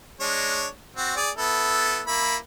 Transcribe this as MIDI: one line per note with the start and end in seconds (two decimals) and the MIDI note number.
0.20 0.67 56
0.20 0.67 62
0.20 0.67 73
0.96 1.15 60
0.96 1.15 66
1.16 1.30 68
1.16 1.30 74
1.37 2.02 59
1.37 2.02 64
1.37 2.02 69
2.07 2.36 58
2.07 2.36 64
2.07 2.36 83